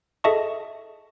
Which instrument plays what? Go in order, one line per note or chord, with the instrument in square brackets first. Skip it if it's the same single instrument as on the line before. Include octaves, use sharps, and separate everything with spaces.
[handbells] G#4 A4 D#5 E5 A5 C#6